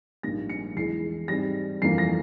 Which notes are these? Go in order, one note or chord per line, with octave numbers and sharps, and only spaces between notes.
A#1 G#2 G3 A#3 A#6
C#7
E2 E3 G#3 E4 C7
G#2 G3 C4 A#6
G1 F2 E3 A#3 F4 C7
A#6